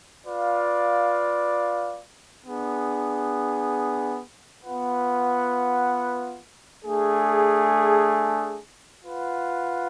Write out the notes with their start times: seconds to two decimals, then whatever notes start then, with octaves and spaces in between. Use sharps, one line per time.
0.25 F4 B4 D5 F5
2.44 B3 D4 G#4
4.64 B3 F4 B4 F#5
6.83 A3 D4 G#4
9.03 F4 B4 F#5